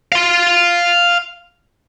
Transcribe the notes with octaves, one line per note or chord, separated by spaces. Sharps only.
F5 C6